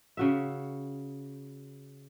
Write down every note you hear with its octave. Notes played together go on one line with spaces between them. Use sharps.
C#3 F#4 E5